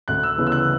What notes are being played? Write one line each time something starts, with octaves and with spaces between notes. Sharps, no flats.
D2 F#6
E6
C#3 E3 B3
E6
F#6